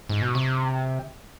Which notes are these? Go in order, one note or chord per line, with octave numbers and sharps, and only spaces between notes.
G#2
B2
C3